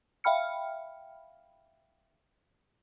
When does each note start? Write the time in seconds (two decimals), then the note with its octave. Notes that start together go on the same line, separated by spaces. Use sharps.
0.24 E5 F5 G5 B5 F6 C#7